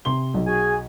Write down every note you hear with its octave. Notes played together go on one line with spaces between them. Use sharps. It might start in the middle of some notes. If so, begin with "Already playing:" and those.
C3 C6 G7
B1
F#4 G#4 G#5